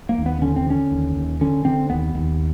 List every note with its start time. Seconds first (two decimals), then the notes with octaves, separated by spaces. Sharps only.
0.09 A#3
0.18 D#2
0.26 B3
0.42 D3 C#4
0.56 C4
0.67 D3 C#4
0.91 D#2
1.16 D#2
1.41 D3 C#4
1.65 D3 C4
1.90 D#2 B3
2.14 D#2